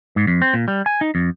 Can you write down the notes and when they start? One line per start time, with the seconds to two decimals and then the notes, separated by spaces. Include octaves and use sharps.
0.16 G#2
0.27 F2
0.42 C4
0.54 A#2
0.68 G3
0.86 G#5
1.01 D#4
1.15 F2